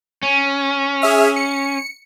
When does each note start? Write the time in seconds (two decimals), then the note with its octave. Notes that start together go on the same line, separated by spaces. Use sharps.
0.23 C#4
1.02 G#4 E5 F6
1.36 C#7